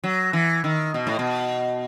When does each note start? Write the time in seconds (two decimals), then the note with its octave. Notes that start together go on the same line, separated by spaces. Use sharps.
0.04 F#3
0.33 E3
0.64 D#3
0.94 B2
1.07 A2
1.19 B2